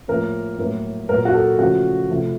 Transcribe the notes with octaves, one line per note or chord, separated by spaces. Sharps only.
A2 F3 A#3 A#4
A2 F#3 A#3
A#2 F#3 A#3 A#4
F#4
A4
C#3 F3 A3 F#4
C3 F3 A3